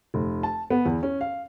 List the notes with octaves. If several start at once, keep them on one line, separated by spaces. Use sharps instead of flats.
F1
A5
B3
E2
C#4
F5